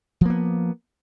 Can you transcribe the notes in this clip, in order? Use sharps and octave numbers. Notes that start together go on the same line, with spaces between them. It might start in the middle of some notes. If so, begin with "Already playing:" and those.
F3 A#3 B3